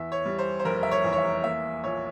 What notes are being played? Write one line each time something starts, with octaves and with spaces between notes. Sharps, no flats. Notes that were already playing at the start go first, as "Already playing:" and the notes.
Already playing: E2 E5
C#5
G3
C5
C5
F1 A#4
E5
C#5
E2
C#5
E5
A#3 E5
A#1 C#5